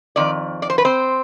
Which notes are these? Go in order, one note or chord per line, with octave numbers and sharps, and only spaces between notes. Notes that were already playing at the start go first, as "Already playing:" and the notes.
F2 D#3 D5
D5
C5
B4
C4 C5